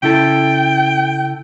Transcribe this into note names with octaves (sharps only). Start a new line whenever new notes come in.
C#3 E4 A4 G5